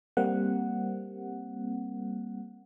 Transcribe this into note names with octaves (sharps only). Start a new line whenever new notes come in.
G3 A#3 C4 F#5